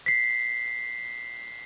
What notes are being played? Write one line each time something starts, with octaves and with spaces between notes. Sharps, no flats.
B6 C7